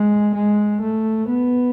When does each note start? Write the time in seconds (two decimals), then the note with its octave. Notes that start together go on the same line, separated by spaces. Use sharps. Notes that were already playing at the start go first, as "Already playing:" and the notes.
Already playing: G#3
0.34 G#3
0.81 A3
1.28 B3